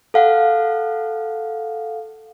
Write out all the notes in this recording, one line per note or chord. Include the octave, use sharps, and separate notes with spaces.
A4 F5 F#5